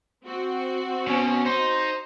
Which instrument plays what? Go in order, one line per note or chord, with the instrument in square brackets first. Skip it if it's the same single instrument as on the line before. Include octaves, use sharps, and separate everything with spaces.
[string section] C4 F#4
[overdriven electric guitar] B2 [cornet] C#4
[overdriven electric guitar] D#4 [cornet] C5